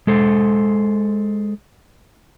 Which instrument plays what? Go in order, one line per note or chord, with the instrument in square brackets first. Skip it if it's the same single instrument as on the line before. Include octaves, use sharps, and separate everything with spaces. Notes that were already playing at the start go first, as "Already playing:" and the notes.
[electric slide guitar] G#3 A4 C5